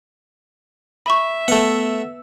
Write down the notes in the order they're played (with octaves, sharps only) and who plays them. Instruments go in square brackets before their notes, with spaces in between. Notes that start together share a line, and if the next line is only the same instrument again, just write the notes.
[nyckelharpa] E5 [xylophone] B5 C#6
[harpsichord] A3 F#5 [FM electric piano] B3 E6